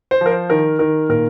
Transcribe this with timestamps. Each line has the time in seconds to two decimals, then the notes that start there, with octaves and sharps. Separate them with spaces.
0.11 C5
0.21 F3 A#4
0.31 C5
0.50 D#3 A#4
0.79 D#3 A#4
1.09 A#2 A#4